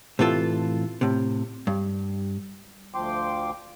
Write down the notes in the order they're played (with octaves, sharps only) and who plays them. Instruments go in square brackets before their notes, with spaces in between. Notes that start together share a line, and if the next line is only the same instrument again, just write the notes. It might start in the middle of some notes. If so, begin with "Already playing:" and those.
[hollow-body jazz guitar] A2 C3 E3 F4 A4
A2 C3
G2
[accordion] D2 F3 G5 C6 D6